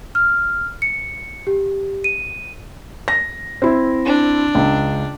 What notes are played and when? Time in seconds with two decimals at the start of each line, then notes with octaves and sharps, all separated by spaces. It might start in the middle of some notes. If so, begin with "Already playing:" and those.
0.15 F6
0.82 C#7
1.47 G4
2.04 D#7
3.08 A#6
3.62 C4 E4
4.06 D4
4.55 C#2